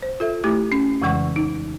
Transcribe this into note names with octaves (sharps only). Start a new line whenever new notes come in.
C5
F4 A4 E5
A3 E4 G4 D6
C#4
F2 C#3 E3 G#3 F#5 C#6
D#4